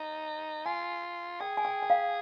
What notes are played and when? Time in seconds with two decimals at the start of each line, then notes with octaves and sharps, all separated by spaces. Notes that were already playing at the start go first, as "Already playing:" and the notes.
Already playing: D#4
0.66 F4 G#5
1.40 G#4 G5
1.57 G#5
1.65 G5
1.82 G5
1.90 F5